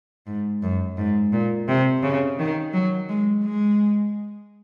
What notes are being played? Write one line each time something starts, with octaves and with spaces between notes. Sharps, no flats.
G#2
F#2
G#2
A#2
C3
C#3
D#3
F#3
G#3
G#3